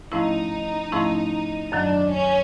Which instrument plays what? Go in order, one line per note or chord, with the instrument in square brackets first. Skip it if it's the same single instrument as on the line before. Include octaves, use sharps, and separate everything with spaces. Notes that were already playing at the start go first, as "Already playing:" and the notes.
[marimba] G#2 F3 A3 C#4 E4 [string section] D#4
[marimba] G#2 F3 A3 C#4 E4
[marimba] F#2 D#3 F#3 [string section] D4
[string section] C#4